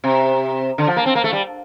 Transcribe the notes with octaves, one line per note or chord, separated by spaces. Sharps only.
C3
D3
F3
A#3
C4
A#3
A3
G3